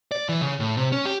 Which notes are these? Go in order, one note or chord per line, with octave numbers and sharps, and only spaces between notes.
D5
E3
C#3
A2
C3
C#4
G4